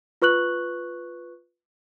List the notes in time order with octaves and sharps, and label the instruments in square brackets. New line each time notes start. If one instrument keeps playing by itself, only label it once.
[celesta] F4 B4 C#6 F#6 F#7